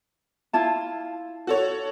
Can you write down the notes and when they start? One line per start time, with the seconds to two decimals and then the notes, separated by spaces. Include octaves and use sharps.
0.53 E4 F4 A5
1.47 F#4 A4 C#5